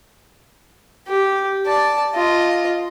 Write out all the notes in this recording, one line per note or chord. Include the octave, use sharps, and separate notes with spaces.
G4
D5 A5
F4 D#5